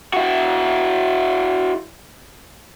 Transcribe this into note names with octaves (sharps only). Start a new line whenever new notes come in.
E4 F#4